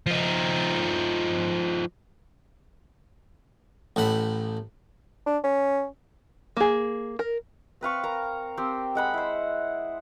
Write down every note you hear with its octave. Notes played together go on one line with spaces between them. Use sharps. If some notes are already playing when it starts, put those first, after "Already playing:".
F3 D#4
A1 A2 F#5 B5
D4
C#4
A#3 G#4
A#4
C4 B4 F5 C#6
A#4 A#5
C4 G4 C6 E6
G#3 F#5 B5
E4 C5